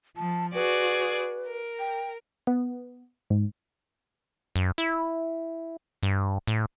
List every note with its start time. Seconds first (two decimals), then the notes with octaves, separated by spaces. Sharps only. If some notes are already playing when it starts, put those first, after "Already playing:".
0.17 F3 A5
0.55 F#4 G#4 B4 D5
1.46 A#4
1.79 G5
2.47 B3
3.30 G#2
4.56 F#2
4.78 E4
6.03 G2
6.47 A2